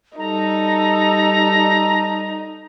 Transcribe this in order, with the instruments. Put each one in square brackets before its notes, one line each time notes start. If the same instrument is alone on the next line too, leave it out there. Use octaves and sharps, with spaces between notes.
[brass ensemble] G3 A4 [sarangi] D#4 [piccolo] A#5